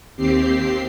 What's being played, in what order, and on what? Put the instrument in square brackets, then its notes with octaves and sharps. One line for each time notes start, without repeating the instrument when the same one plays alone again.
[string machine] D#2 C4 G4 C7